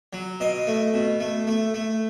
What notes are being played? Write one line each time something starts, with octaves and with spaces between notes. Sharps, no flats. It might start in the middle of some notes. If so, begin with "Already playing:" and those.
F#3
B2 D#5
A3
B2
A3
A3
A3